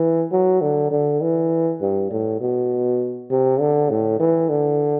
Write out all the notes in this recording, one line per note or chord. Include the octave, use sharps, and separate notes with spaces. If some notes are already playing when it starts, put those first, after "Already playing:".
Already playing: E3
F#3
D3
D3
E3
G2
A2
B2
C3
D3
A2
E3
D3